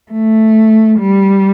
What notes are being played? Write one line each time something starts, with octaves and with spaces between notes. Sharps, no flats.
A3
G3